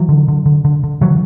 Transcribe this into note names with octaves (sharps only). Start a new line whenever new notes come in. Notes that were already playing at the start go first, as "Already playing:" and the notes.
Already playing: E3 F#3
D3
D3
D3
D3
D3
C#3 E3 F#3